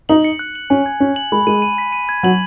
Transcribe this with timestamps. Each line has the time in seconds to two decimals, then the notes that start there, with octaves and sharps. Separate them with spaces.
0.09 D#4 F#7
0.24 C#7
0.39 F#6
0.55 F#7
0.70 C#4 G#5
0.86 G#6
1.00 C#4 F#6
1.16 F#7
1.32 G#3 B5
1.47 G#3 D#7
1.62 D#7
1.78 B6
1.93 D#7
2.09 G#6
2.23 F#3 F#7